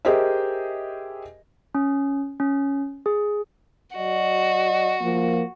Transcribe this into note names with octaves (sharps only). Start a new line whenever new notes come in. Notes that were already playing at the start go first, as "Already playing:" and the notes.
G4 G#4 A#4 C5 D#5 E5
C#4
C#4
G#4
F#3 F#4 D5 D#5
F3 A#3